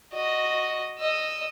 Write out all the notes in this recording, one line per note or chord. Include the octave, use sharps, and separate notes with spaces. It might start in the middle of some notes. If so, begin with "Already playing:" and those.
F#4 D#5
D#5 E6